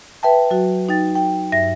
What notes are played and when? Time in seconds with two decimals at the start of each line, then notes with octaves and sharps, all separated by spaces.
0.23 B4 E5 G5 A5
0.50 F#3 F#4
0.89 D#4 G5 A6
1.15 G5
1.52 G2 E5 A#6